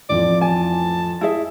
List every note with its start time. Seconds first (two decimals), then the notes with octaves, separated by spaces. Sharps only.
0.09 A1 F2 F3 D5
0.41 G#5 A5
1.21 E4 G#4 E5